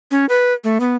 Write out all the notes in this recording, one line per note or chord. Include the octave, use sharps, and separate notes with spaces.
C#4
B4
A3
B3